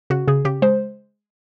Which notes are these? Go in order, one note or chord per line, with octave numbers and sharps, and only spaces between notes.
C#3 F#4
C#3 G#4
C#3 G4
G#3 C5